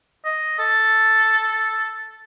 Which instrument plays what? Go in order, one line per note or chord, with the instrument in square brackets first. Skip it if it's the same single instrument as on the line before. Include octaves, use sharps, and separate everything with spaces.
[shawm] D#5
A4